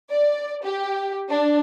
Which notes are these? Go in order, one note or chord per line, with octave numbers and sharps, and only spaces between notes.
D5
G4
D4